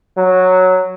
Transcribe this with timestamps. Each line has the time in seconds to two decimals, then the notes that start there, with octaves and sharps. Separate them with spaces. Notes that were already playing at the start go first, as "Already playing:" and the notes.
0.17 F#3